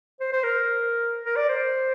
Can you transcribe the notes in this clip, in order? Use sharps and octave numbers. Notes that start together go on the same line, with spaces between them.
C5
C5
A#4
A#4
D5
C5